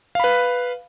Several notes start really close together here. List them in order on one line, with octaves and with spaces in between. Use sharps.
F5 B5 B4